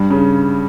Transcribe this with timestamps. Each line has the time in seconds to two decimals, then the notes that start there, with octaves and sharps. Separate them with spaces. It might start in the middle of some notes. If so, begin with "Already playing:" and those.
Already playing: G2
0.11 C#3